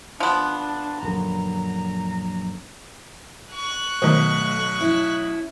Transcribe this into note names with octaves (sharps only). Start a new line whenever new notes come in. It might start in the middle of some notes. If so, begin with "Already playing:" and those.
F3 B3 D4
A#1 F#2 D3 A#5
C#6 F#6
B1 B2 D#3 A3 C5
C#4 E4